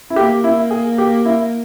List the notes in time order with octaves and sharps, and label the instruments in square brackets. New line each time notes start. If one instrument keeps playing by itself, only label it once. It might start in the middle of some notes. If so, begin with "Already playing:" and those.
[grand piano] E4
[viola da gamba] A#3 [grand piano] G4
[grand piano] E4
G#4
G4
E4